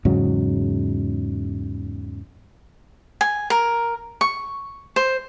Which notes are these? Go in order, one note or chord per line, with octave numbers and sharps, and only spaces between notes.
E2 G#2 C#3 F#3
G#5
A#4
C#6
C5